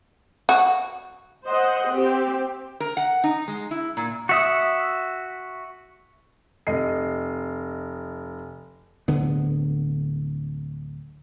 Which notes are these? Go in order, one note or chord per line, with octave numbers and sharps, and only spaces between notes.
F#4
C5 D#5 F#5
C4 G4
A#4
F#5
D#4
G#3
E4
A#2
F#4 E5 D#6
F1 D#5 C7
D1 D3 B3